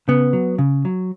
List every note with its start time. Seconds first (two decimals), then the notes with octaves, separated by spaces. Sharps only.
0.08 C#3 B3
0.33 F#3
0.58 C#3
0.85 F#3